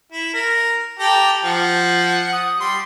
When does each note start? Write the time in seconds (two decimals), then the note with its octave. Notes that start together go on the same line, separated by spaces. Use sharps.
0.12 E4
0.34 A#4
0.99 G4 A4 A#5
1.44 F3 F#5
2.32 D#6
2.60 G3 C6